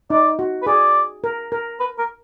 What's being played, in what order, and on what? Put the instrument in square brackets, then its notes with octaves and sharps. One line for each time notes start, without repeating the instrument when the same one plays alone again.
[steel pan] D#4 [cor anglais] D5
[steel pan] F#4
[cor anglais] B4
[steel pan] G#4 [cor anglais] D5
[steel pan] A#4
A#4
[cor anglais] B4
A#4